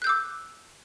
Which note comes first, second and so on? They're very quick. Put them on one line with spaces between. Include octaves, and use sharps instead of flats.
F#6 G6 E6 D6